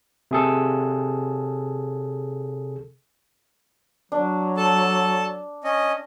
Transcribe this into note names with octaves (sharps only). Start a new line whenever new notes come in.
C3 G#4 A4
F#3 D4
A4 A5
C#4 D#5